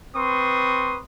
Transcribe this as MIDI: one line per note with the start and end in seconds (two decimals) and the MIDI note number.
0.16 1.01 60
0.16 1.01 71
0.16 1.01 84
0.16 1.01 85
0.16 1.01 87